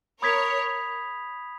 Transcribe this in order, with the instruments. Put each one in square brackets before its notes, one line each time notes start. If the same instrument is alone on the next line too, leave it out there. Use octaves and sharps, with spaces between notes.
[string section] A#4 C#5 [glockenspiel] B5 D#6 G#6 B6 F7